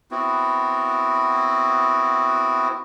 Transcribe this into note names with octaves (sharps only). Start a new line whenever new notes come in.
B3 C4 E4 F#4